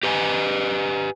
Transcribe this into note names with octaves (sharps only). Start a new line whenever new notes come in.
G4 B4 D#5 G#5